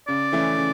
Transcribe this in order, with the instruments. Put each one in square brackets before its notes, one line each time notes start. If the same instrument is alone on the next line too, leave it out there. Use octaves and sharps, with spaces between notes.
[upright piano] C#3 [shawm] D5
[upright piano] E3 A3 C#4 E4
C#3